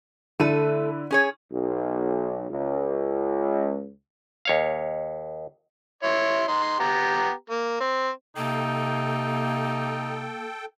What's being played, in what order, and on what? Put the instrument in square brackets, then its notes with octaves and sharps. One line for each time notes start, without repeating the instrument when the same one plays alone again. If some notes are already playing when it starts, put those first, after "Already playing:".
[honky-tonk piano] D3 E4 D#7 [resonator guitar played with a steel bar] A3 A4
[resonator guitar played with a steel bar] C#4 G#4 C#5
[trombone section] B1
C#2
[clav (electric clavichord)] D#2 C#5 F5
[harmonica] E4 C#5 C6
D#4 C6
B3 G4 A#5
A#3
C4
[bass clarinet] C3 [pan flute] A#3 [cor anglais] D#4 [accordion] A4 G5